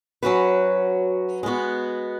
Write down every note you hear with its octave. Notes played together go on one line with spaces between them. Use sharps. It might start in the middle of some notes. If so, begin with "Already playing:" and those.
F#3 C#4 F#4 B4
G#3 B3 F#4